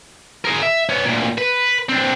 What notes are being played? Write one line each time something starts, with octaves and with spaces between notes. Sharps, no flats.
G#4 A#4
E5
B3 C#4
D2 A#2
B4
C4 D4